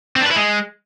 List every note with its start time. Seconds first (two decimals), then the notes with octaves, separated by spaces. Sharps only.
0.16 C4
0.21 D4
0.26 B4
0.31 E4
0.36 G#3